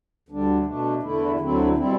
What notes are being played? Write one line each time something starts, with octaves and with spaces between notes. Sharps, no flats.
D2 D3 G3 D4
B2 A3 D4
E2 D3 A3 E4
D2 D3 F#3 C4 E4
B2 G3 C4 E4